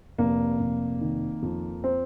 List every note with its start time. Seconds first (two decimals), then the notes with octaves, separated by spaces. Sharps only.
0.18 F1 A#3
0.59 F1
1.01 D#3
1.42 F2
1.84 C4